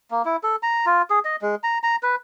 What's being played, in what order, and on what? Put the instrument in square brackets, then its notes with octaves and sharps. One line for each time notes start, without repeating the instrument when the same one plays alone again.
[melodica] A#3
E4
A4
A#5
F4
G#4
D#5
G#3
A#5
A#5
B4